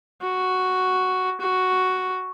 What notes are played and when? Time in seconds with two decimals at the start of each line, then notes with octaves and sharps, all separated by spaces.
0.22 F#4
1.41 F#4